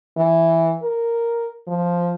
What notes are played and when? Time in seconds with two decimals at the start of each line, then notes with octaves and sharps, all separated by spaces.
0.17 E3
0.82 A#4
1.67 F3